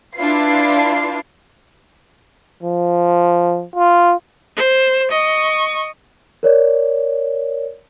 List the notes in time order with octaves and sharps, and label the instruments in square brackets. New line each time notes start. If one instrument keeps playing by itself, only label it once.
[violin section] D4 E4 F4 B4 C7
[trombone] F3
F4
[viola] C5
D#5 C#6
[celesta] A#4 C#5 D5